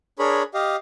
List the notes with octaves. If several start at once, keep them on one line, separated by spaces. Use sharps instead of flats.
D4 G#4 A#4 C#5 B5
G4 D#5 F5